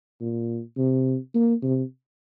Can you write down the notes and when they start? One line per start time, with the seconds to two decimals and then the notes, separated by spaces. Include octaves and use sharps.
0.21 A#2
0.78 C3
1.34 A#3
1.63 C3